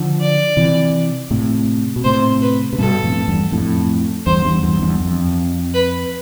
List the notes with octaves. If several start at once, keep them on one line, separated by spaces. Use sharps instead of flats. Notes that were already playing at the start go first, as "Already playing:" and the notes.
Already playing: D3 F3
D5
C3 E3
A2 C3
B2
A2 C3 C5
B4
C3
G2 B2 A4
F2 A2
E2 G2
F2 A2
E2 G2 C5
E2 G2
E2 G2
E2 G2
F2
B4